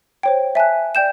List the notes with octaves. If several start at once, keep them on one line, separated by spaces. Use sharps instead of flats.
C5 C#5 G5
E5 G#5 A5 F#6
D5 G5 G6 E7